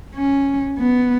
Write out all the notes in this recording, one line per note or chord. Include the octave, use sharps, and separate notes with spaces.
C#4
B3